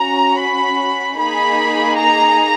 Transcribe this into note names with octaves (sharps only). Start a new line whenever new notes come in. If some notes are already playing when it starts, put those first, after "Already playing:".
Already playing: C#4 F#4 A#5
B5
A#3 D#4 G#4 B5
A#5